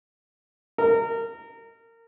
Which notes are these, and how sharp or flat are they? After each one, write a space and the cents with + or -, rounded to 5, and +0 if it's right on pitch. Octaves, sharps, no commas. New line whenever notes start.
A#4 -25